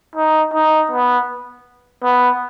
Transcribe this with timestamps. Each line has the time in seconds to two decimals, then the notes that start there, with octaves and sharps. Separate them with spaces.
0.16 D#4
0.54 D#4
0.91 B3
2.04 B3